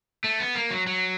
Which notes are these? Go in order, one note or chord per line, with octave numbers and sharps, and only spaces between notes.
A3
B3
A#3
F#3
F#3